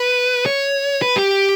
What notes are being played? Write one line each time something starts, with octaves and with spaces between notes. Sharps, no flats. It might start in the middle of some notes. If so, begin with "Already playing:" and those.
Already playing: B4
C#5
B4
G4